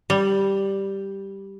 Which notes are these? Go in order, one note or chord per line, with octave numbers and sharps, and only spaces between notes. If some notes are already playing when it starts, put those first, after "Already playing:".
G3